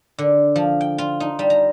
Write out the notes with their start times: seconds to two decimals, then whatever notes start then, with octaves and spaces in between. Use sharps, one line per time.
0.19 D3
0.56 F3
0.81 G5
0.98 F4
1.20 D#4
1.39 G3
1.50 A#5